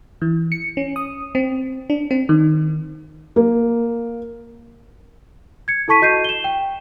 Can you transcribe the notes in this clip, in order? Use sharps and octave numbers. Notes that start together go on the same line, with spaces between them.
E3
C#7
C#4
D#6
C4
D4
C4
D#3
A#3
G#6 C#7
E4 A4 A5 C#6 B6 D#7
F#4 D#5 G6 C7 D#7
E7 G7
G5